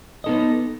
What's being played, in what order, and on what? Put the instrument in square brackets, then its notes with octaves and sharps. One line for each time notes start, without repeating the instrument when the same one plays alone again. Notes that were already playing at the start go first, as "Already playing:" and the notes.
[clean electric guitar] B3 D#4 A4 D#5